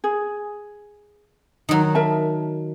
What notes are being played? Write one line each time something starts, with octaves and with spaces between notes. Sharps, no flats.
G#4
D#3 F#3
A#4 E5 A5